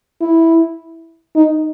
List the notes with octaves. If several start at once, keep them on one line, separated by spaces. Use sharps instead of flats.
E4
D#4